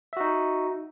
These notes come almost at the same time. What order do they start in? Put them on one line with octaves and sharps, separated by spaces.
E5 F#4 D#4